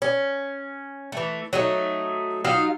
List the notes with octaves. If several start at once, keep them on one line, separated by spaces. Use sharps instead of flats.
C#4
E3 A3
F#3 A3 D#4
F#3 D#4 F4 F5